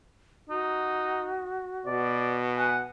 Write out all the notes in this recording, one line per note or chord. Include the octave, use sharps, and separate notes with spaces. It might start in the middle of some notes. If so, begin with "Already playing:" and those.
D#4 F#4
B2 D5
F#5 G#5